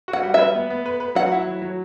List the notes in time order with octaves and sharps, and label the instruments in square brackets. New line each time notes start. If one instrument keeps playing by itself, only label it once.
[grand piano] F#4
[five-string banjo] F#5
[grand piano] G3
[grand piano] B4 [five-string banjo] E5
[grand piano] B3
B3
B4
B4
[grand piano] F#3 [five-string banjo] F#5
[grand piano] E4
F#3
F#3